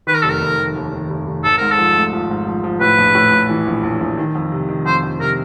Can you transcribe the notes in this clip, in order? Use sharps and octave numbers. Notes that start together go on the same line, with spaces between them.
D#3 B4
A#4
F1 A4
A#4
F1
D#3
D#2
D#3
F1
F1
G#1 A4
G#2 A#4
A4
F3
A3
F3
G#2
F3
F3
A2 B4
A#1
A2
A2
E3
A#1
A#1
A#1
D#3
F2
C3
D#3
F2 C5
F2
C3 A#4